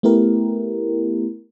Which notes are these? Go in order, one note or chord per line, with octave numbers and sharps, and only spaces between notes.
A3 B3 E4 G4 A#4